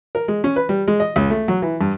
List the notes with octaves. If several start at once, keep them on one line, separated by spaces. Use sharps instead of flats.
A#4
G#3
C#4
B4
G3
G#3
D#5
C#2
A3
F#3
E3
G2